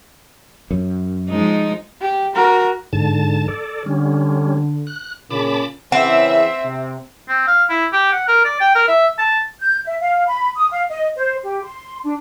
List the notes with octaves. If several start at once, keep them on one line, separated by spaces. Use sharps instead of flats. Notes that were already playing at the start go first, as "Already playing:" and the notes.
F#2
F3 G#3 D#4
G4
F#4 A#4
G#2 D3 A5
A4 D5
D3 G3 C#4
F#6
A#2 C#3 A5 B5 D6
C#3 E3 C4 E5 F#5
C3
C4
F5
E4
G4
F#5
A#4
D5
G5
A#4
E5
A5
G6
E5
F5
B5
D#6
F5
D#5
C5
G4
C6
D4